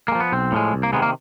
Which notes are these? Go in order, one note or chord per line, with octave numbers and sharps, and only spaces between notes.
G#3 A#3
F3
B3
B1 C4
A2 F3 G#3
C2
A#3
C3 D#3 G#3 B3
A#3